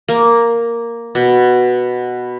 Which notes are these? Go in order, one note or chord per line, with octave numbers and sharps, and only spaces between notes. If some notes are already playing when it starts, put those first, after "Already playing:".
A#3
B2